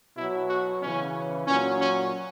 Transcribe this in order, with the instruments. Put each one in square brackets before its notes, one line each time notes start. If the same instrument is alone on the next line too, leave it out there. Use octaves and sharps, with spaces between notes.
[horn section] B2 F#3 E4
F#4
C#3 E3 C#4
A#2 F#3 C#4
C#4